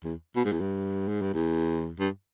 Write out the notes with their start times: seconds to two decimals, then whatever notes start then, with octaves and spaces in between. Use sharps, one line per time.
0.04 E2
0.36 B2
0.45 G#2
0.52 E2
0.61 G2
1.08 G#2
1.21 G2
1.34 E2
1.99 G2